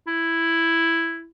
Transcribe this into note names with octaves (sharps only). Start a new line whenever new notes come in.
E4